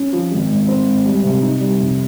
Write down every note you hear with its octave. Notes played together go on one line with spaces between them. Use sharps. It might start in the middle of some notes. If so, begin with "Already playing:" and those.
Already playing: C#4
F3
G#1
G#2
C4
G#2
G3
C3
D#4
G3
F1